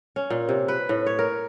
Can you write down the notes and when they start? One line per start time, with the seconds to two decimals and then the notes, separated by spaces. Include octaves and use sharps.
0.16 C#4
0.30 A#2
0.49 C3
0.68 B4
0.89 A2
1.06 C#5
1.19 A#4